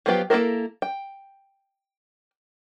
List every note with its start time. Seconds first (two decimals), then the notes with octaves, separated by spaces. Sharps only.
0.06 F3 F#3 B3 F4 G4
0.30 A#3 C4 E4 A4 A#4
0.82 G5